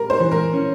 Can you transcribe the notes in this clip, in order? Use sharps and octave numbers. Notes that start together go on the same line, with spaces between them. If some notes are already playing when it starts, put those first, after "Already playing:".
Already playing: G3 A#4
C5
E3
A#4
C#4